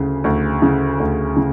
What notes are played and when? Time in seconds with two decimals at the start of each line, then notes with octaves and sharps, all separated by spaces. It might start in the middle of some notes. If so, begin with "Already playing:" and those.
Already playing: D2 C#3
0.24 D2
0.62 C#3
0.99 D2
1.37 C#3